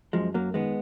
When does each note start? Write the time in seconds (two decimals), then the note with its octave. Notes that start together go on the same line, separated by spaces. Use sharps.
0.13 F#2 F3 G#3
0.34 F#2 F#3 A#3
0.54 D#3 G#3 B3